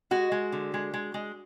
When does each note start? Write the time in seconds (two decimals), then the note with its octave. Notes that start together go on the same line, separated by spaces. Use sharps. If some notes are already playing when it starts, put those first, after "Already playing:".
0.11 G#3 F#4
0.32 G#3
0.52 D3
0.74 G#3
0.94 G#3
1.14 G#3